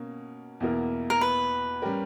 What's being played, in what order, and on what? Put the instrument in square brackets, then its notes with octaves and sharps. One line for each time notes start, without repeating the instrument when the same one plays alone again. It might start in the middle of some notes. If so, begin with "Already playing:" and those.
Already playing: [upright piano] B2 A#3 C#4
E2 B2 A#3 E4 A#4
[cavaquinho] A#4
B4
[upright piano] G3 C#4 G4 A#4